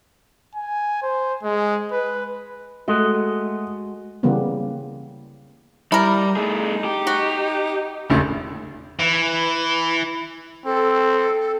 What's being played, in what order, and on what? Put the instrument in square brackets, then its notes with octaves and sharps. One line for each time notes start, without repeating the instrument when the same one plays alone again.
[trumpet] G#5
C5
G#3
B4
[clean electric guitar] G#3 F#4 D#5 [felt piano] A3
[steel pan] C#3 E3 G3 A#3 B3
[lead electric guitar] G3 [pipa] E4 A#4
[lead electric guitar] A3 G#4 [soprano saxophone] D#4
[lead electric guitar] G4
[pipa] F#4
[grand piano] E1 A1 D3 [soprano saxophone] E4
[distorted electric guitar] E3
[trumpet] C4 [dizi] A4